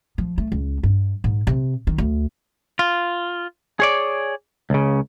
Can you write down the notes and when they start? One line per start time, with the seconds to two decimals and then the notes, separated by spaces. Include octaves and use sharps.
0.18 F3
0.38 A3
0.52 C#2
0.83 G2
1.24 G#2
1.47 C3
1.87 D#3
1.98 D2
2.79 F4
3.80 G#4 C#5 D5
4.70 C#2 C#3